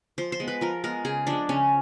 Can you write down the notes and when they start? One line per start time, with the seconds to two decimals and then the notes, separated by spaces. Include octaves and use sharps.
0.18 F3 C5
0.32 C5
0.40 G#3 B3
0.48 B4
0.61 F3 A#4
0.84 G#3 B3 A#4
1.05 C#3 G#4
1.27 F3 G#3 D4
1.49 C#3 C#4